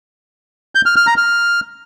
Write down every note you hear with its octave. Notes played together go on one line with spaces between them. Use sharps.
G6
F6
F6
A#5
F6